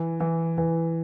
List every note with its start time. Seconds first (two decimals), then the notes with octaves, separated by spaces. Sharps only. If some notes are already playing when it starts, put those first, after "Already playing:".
Already playing: E3
0.20 E3
0.58 E3